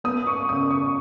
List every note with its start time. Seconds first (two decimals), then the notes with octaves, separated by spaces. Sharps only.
0.04 B3 D#6
0.27 C#6
0.48 C#3 D#6
0.71 C#6